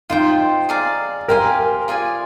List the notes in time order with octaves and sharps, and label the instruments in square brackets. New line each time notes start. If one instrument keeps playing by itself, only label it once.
[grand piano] D#4 [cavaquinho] F4 C5 G5
[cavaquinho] G#4 D5 F5 A#5
[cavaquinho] G4 C5 F5 G#5 [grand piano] A#4
[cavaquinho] F4 G#4 D5 G#5